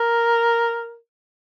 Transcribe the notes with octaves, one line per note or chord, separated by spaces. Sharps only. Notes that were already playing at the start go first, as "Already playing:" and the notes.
Already playing: A#4